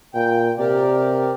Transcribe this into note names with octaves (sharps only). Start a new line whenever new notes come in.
A#2 G5
C3 G4 A#4 D5